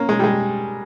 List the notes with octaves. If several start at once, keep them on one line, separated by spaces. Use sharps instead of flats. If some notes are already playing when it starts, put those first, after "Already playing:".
Already playing: A#3 C#4
G#3
G3
G#3